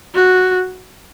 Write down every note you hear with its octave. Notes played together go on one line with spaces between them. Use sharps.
F#4